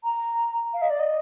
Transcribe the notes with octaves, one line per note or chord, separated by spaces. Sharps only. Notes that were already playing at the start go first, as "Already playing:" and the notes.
A#5
F5
D#5
D5
D#5